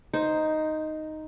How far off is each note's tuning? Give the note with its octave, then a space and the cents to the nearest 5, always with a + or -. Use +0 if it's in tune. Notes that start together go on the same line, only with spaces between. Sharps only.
D#4 +0 C5 +0